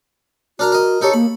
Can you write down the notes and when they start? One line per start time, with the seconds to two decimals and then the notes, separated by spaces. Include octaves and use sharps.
0.59 D4 F#4 A#4 A#5
0.72 A#4 D#5
1.02 D#4 G4 A4 C#5
1.13 A#3 B5